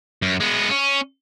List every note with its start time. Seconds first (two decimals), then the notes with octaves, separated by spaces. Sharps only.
0.22 F#2
0.40 G#3 B3
0.70 C#4